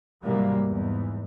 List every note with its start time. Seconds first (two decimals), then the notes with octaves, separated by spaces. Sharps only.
0.23 G#2 C3 E3 F#3 G3 A#3
0.65 E2 G#2